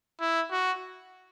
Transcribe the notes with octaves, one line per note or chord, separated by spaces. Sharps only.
E4
F#4